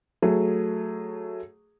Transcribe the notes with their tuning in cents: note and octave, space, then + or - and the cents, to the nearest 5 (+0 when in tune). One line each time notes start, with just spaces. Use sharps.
F#3 -5 A3 +5 G#4 +0